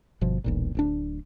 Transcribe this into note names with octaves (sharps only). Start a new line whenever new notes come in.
G1 B2 F3
E1 B1 A#2
D1 D2 D4